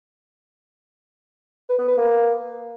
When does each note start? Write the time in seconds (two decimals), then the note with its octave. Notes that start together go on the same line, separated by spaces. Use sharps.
1.69 B4
1.79 B3
1.88 B4
1.97 A#3